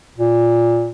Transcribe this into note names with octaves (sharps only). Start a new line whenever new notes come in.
A#2